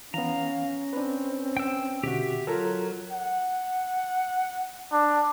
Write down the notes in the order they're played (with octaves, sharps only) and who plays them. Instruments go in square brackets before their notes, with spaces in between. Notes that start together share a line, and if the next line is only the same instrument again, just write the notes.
[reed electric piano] E3 B3 [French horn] C#4 [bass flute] F5 [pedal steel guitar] A#5
[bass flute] C4 [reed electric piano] D4 B4
[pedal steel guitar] G5 E6
[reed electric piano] B2 D3 F#4 [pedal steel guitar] G4 E5
[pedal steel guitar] F#3 C#5 [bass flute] F4 [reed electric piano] A4 A#4 A#5
[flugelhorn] F#5
[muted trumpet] D4